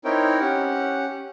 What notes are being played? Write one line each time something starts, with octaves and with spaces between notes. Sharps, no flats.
C4 D#4 E4 A#4 C#5 G5
C#4 G4 F#5